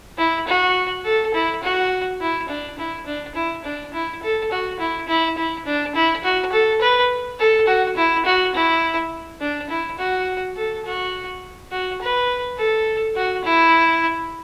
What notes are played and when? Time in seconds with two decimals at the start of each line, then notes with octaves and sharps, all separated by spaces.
0.18 E4
0.47 F#4
1.04 A4
1.34 E4
1.63 F#4
2.21 E4
2.48 D4
2.78 E4
3.06 D4
3.35 E4
3.64 D4
3.93 E4
4.22 A4
4.51 F#4
4.79 E4
5.08 E4
5.37 E4
5.65 D4
5.95 E4
6.24 F#4
6.52 A4
6.81 B4
7.39 A4
7.67 F#4
7.97 E4
8.25 F#4
8.54 E4
9.41 D4
9.69 E4
9.98 F#4
10.56 A4
10.85 F#4
11.71 F#4
12.01 B4
12.58 A4
13.16 F#4
13.44 E4